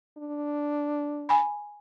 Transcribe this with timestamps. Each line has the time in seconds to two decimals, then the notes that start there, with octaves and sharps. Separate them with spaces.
0.18 D4
1.29 G#5 B5